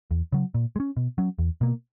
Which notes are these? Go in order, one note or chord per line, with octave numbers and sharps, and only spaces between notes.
E2
C#3 F#3
A#2
G#3
C#4
B2
F#3 C#4
E2
B2 A#3